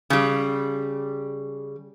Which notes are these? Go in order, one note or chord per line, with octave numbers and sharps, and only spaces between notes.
C#3 G3